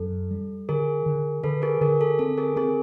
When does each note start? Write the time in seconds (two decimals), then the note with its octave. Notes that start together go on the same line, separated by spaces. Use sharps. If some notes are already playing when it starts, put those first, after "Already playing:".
Already playing: F#2 A4
0.31 G3
0.69 D3 G#4 A#4
1.06 D3
1.44 D3 A4 B4
1.62 G#4 A#4
1.81 D3 G#4 A#4
2.01 A4
2.19 C4 A4
2.38 G#4 A#4
2.56 C4 G#4 A#4